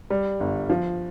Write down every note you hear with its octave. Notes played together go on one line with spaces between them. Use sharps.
G3
G1
F3